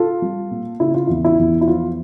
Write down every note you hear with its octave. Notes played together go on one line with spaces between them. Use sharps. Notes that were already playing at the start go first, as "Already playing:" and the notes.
Already playing: F4 A4
G3
A#2
C#3 E4
F4
E2 E4
E4
E2
E4
F3 F4